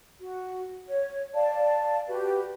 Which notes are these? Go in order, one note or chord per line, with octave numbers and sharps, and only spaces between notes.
F#4
C#5
D5 F5 A5
F#4 G4 B4